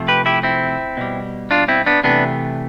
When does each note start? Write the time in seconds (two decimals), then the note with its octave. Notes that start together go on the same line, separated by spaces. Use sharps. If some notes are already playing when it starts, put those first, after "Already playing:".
Already playing: C3 F3 A3
0.08 G4 B4
0.26 E4 G4
0.43 C4 E4
0.97 B2 G3
1.51 D4 F4
1.68 C4 E4
1.86 B3 D4
2.04 C3 E3 A3 B3 D4